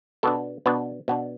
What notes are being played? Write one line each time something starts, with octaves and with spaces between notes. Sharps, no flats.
B2 B3 D4 A4
B2 B3 D4 B4
B2 B3 D4